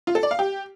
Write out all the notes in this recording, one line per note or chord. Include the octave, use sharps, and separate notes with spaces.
F4
A4
D5
F5
G4